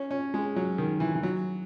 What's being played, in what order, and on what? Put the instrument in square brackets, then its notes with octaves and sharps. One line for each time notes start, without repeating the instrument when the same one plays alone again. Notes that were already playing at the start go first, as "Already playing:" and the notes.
Already playing: [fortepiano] C#4
C#4
G#3
F#3
D#3
E3
E3
F#3